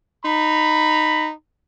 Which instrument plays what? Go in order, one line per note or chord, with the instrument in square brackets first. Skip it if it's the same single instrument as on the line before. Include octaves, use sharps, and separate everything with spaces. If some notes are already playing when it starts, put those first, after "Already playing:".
[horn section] D#4 A#5 B5